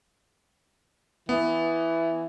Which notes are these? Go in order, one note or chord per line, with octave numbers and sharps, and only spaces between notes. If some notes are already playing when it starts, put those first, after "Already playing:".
E3 B3